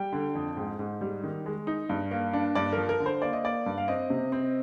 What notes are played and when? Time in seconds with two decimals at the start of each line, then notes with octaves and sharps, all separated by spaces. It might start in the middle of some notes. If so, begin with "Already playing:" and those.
Already playing: G3 G5
0.13 D3
0.35 F2
0.57 G#2
0.79 G#2
1.01 G3
1.23 D#3
1.46 G#3
1.67 D#4
1.89 G2
2.11 A#3
2.33 D4
2.55 G2 D5
2.72 F3 A#4
2.89 A#4
3.00 D3
3.06 C5
3.22 A#3 D5
3.33 D#5
3.44 A#3 D5
3.66 G2
3.78 F5
3.88 C4 D#5
4.10 C3
4.32 C4